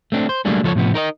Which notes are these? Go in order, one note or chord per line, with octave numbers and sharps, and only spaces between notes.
A3 C4 D4
C5
F#3 G3 A3 A#3 D4 G#4
C#2 F3 A4 A#4 C#5
A2 C3 F3 B3
D#4 A#4 B4 D#5